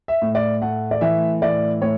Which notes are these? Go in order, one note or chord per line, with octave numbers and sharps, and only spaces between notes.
E5
A2
D5
A3 F#5
D5
E3 E5
A2 D5
A2 C#5